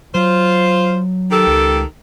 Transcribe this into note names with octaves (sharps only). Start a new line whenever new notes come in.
F#3 F4 C5
D#3 G4 A4
C#2